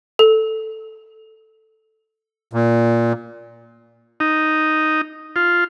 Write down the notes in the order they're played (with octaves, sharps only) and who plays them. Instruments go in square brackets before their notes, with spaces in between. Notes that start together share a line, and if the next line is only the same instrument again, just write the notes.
[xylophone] A4
[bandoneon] A#2
[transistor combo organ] D#4
F4